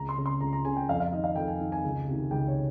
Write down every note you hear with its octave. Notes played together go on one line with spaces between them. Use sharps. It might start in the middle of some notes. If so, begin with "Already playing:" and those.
Already playing: C#2 A#5
C6
C#3
C6
C#2 A#5
A#5
C#3 G#5
G5
F2 F5
F5
D#3 D#5
F5
F2 G5
G#5
D#3
G#5
C#2
C3 D#3
C#2 G5
C#5